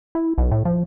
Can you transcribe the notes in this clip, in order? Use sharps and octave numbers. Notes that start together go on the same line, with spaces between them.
E4
B1
A2
F3